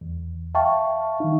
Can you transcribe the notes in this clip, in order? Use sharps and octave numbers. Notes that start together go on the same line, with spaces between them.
E2
E5 F5 G5 A5 C#6
D#3 D#4